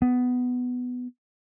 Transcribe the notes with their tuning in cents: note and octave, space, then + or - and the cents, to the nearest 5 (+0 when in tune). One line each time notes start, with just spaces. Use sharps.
B3 +10